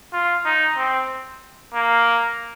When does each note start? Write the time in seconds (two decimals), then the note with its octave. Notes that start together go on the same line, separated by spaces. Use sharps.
0.13 F4
0.46 D#4
0.78 C4
1.74 A#3